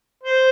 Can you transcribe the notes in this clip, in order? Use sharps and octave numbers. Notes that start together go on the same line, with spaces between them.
C5